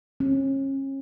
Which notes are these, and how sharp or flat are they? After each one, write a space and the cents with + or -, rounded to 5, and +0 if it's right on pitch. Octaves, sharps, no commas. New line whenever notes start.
C#4 -35